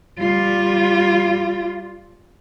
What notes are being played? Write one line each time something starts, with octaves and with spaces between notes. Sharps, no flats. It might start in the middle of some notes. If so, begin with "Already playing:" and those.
G3 F4